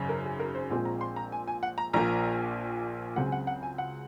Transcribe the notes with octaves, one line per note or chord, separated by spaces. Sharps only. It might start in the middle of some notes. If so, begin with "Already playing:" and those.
Already playing: G#1 F#2 C#3
A#4
G#4
A#4
C5
A#1 A#2 F3 G#3 C4 G#5
A#5
C6
A#5
G#5
G#5
F#5
A#5
A#1 A#2 F3 A#3 A#5
C#2 C#3 F#3 C4 F#5
G#5
F#5
F#5
G#5
F#5